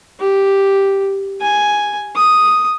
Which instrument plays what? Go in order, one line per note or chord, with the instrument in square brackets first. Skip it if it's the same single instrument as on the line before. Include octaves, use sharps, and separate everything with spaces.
[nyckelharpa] G4
G#5
D#6